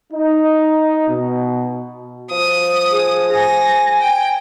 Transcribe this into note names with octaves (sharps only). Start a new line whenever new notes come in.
D#4
B2
F3 D#6
G#4
G#5 A#6
G5